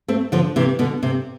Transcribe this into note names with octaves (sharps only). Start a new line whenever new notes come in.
A3 C4
D3 F3
C3 E3
B2 D3
C3